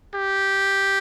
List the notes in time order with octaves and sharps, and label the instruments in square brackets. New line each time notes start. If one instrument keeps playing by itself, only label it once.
[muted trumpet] G4